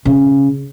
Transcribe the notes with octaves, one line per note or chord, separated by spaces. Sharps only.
C#3